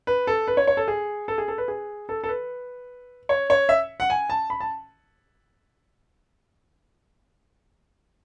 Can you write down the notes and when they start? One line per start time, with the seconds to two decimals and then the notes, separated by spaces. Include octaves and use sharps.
0.07 B4
0.27 A4
0.48 B4
0.57 C#5
0.67 C#5
0.77 A4
0.88 G#4
1.28 A4
1.38 G#4
1.48 A4
1.58 B4
1.68 G#4
2.09 A4
2.24 A4
2.29 B4
3.29 C#5
3.50 C#5
3.69 E5
4.00 F#5
4.10 G#5
4.30 A5
4.50 B5
4.61 A5